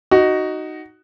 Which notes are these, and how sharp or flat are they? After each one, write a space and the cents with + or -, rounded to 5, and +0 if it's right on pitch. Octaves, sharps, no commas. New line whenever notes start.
D#4 +0 F#4 +10